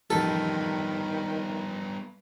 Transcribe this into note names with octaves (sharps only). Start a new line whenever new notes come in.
A1 F2 D#3 G3 B3 A4